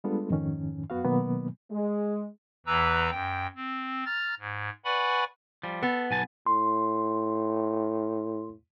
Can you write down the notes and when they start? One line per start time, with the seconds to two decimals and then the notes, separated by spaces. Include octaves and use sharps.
0.04 G3 G#3 B3 D4 F4 A4
0.30 F2 G#2 D#3 C#4
0.90 F#2 B3 F#4 F5
1.04 B2 D#3 F#3 A#3 B3
1.71 G#3
2.66 E2 E3 B4 A#5 E6
3.11 F#2 G5
3.55 C4
4.06 A#5 F6 A6
4.40 G#2
4.85 B4 D5 F#5 G#5 B5 C#6
5.63 F3 G3
5.83 B3 A4
6.11 B1 G#5 A5
6.47 A2 C6